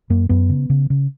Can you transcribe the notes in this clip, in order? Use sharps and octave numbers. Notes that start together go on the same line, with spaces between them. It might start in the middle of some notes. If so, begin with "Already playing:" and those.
F#2 A#3
F#2 B3
C#3
C#3
C#3